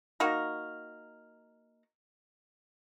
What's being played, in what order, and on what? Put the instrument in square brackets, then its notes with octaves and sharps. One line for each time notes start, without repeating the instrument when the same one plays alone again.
[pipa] A#3 D#4 F#4 A#4